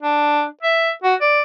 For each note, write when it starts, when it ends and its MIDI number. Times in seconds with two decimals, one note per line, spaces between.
0.03 0.44 62
0.63 0.90 76
1.04 1.15 66
1.21 1.43 74